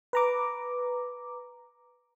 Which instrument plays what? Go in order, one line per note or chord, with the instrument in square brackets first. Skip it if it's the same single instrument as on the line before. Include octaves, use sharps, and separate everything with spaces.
[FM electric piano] B4 A#5 D6